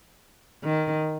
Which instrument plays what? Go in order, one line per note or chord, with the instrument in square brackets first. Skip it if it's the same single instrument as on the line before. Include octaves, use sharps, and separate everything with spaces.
[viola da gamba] D#3